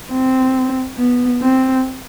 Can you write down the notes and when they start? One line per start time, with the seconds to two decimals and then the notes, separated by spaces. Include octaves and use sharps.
0.11 C4
0.97 B3
1.41 C4